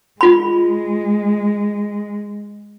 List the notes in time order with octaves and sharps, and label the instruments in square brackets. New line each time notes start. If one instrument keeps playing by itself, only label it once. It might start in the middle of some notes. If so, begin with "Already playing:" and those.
[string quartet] G#3 [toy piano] F4 B5